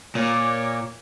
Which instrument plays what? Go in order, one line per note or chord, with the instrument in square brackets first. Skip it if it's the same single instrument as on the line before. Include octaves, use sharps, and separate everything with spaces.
[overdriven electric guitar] A#2 [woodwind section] C#5 D6